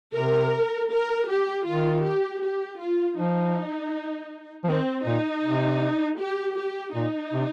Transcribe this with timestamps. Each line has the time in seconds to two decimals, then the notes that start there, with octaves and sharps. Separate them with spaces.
0.14 C3 A#4
0.90 A#4
1.28 G4
1.66 D#3 F4
2.04 G4
2.42 G4
2.80 F4
3.17 F3 D#4
4.64 F3
4.68 D#3 C4
5.06 A#2 D#4
5.44 C3
6.19 G4
6.57 G4
6.95 A#2 D#4
7.33 C3